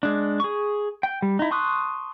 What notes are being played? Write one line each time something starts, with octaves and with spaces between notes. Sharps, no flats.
G#3 D4
G#4 C#6
G5
G3
D#4 E4
A5 C6 C#6 D#6 F#6